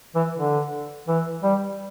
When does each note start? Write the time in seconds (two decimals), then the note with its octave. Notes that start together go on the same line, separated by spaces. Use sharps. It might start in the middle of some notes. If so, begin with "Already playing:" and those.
0.15 E3
0.38 D3
1.08 E3
1.43 G3